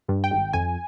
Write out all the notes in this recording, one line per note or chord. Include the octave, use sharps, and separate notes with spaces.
G2
G5
G#1
F2 G#5